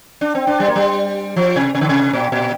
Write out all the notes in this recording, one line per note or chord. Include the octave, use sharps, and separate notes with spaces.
D4
C4
D4
G3
A#3
G3
F3
C3
C3
D3
C3
A#2
A#2